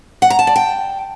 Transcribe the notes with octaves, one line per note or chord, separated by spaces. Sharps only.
F#5
A#5
A5
D5
G5